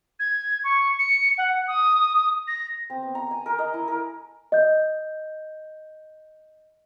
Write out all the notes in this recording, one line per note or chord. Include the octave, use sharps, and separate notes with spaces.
G#6
C#6
C#7
F#5
D#6
A#6
C4
B3
A#5
G#5
A#4
D#5
E4
A#4
D#5 G6